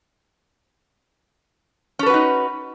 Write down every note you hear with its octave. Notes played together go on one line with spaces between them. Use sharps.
C#4 D#4 F#4 A4 B4